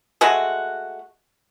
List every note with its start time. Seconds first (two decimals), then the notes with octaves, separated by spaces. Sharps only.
0.21 G#3 A3 F#4